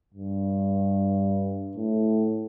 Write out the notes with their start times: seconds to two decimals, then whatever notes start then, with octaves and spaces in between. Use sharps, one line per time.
0.14 G2
1.77 A2